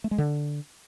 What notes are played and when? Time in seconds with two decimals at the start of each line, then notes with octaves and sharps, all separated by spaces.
0.04 A3
0.11 G#3
0.18 D3